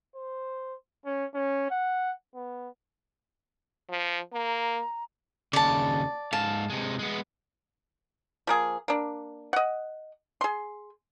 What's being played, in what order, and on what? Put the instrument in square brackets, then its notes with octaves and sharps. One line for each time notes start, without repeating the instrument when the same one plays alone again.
[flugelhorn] C5
C#4
C#4
F#5
B3
[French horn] F3
[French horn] A#3 [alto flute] A#5
[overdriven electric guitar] D#2 C#3 [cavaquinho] D5 A5
[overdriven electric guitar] G#2 F5 [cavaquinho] A5
[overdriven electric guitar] C3 G#3
G#3 B3
[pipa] F3 A#3 G#4
A#3 D4
D#5 F#5
G#4 C6